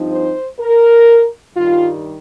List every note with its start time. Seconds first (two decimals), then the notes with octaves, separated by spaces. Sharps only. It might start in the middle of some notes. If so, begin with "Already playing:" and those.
Already playing: G2 F3 C4 D#4
0.12 C5
0.60 A#4
1.54 G2 D#3 G3 F4